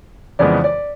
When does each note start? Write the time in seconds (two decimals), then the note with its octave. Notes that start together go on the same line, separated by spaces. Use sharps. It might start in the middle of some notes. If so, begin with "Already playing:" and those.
0.39 F2 C#3 E3 G#3 B3 D5
0.64 D5